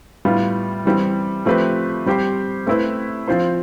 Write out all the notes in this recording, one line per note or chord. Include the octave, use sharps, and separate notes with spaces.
A2 G3 B3 F4
E3 G3 C4 G4
F3 A3 C4 G4 B4
G3 C4 G4 C5
A3 C4 E4 B4
F3 C4 F4 C5